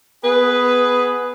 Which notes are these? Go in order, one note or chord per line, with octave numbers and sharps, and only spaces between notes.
B3 G#4 B4